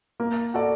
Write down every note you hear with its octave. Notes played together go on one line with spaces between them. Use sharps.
A#3
F#4 A4 D5